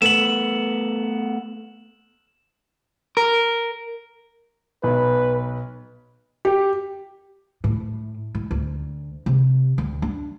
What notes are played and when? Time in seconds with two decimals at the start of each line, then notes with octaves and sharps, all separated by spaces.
0.02 A3 B3 E7 F#7
3.17 A#4
4.83 B1 B4
6.45 G4
7.64 A2
8.35 A2
8.51 D2
9.26 C3
9.78 D2
10.02 D4